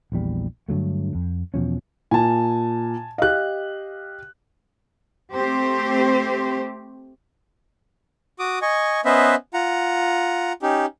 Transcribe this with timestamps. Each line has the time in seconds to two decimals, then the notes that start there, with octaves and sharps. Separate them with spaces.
0.12 A#1 E2 G3
0.69 G2 D3 F#3 A3
1.15 F2
1.54 E2 B2 F3 C#4
2.11 A#2 G#5 A5
3.18 G4 D#5 F5 F#6
5.32 A3 C4 G4 C5
8.39 F#4 D6 D#6
8.62 D#5 G#5 C#6
9.05 B3 C#4 B4 C5 D#5 E5
9.54 F4 F#5 A#5
10.62 C#4 D#4 G4